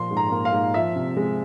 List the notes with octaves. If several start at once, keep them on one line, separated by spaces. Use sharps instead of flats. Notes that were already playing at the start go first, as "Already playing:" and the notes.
Already playing: A#2 F3 C6
G#2
A#5
A#3
F5
G#2
F3 E5
C3
G#3